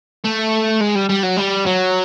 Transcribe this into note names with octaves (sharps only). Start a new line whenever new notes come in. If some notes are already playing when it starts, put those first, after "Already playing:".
A3
G#3
G3
G3
F#3
G3
F#3